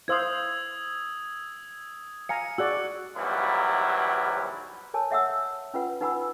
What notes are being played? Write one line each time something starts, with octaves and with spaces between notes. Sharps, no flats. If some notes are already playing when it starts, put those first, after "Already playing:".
E4 C5 F5 D#6 E6 G#6
F5 G#5 A#5 C#7
F#4 G#4 D5 E6 F#6
A#1 D#2 F#3 G3 E4 B4
A#4 C#5 G#5 A5
C#5 E5 F#5 D#6 E6
C#4 F4 B4 F#5
D#4 B4 F#5 G#5 B5 E6